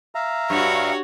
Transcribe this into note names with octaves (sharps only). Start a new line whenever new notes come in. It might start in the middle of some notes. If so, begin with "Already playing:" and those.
E5 F5 A#5
G2 F#4 C#5